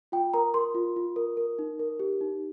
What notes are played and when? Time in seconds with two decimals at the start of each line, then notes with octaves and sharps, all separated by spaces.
0.12 F4 G5
0.34 A#4 A#5
0.54 A#4 C6
0.75 F4
0.96 F4
1.16 A#4
1.37 A#4
1.59 D#4
1.79 A#4
2.00 G4
2.21 D#4